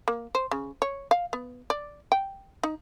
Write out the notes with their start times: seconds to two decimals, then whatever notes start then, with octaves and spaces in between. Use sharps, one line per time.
0.08 A#3
0.35 C5
0.51 C#3
0.82 C#5
1.11 F5
1.33 B3
1.70 D5
2.12 G5
2.63 D#4